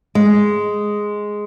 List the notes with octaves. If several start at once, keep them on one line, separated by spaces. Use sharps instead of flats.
G#3